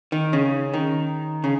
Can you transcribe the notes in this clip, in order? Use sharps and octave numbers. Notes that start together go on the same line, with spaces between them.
D#3
C#3
D#3
C#3